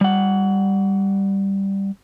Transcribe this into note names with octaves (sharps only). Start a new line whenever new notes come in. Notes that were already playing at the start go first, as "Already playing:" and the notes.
G3 F#5